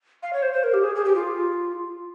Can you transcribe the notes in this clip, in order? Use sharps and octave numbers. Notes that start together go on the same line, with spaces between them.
F5
C#5
C5
C5
A#4
G4
G#4
G#4
G4
F4